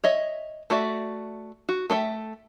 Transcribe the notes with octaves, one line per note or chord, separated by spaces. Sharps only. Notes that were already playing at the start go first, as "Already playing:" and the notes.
C#5 D#5 E5
A3 F#4 D5 E5
F#4
A3 A4 E5 G5